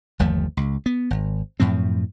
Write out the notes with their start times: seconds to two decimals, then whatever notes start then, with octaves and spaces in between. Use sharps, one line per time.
0.19 G1 D#2 F3 A3
0.57 C#2
0.86 B3
1.11 G#1
1.60 F#2 A2 F3 C4